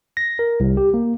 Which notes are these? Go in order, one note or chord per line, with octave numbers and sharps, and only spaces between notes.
A#6
A#4
C2
G4
A#3